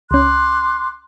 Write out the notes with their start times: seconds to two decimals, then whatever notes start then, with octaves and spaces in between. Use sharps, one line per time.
0.11 C#2 C#4 C6 D6 F#6